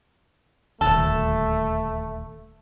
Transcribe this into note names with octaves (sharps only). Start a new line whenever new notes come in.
D#1 D2 A3 A4